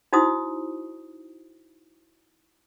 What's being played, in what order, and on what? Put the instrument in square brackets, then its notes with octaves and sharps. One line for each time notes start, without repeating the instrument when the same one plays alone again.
[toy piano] D#4 E4 F#4 C5 D#6